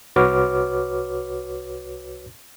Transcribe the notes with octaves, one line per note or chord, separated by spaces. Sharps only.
C2 F#4 B4 C#5 D6 F6